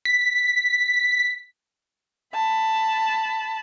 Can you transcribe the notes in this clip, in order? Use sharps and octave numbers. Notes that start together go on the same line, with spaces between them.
B6
A5 B5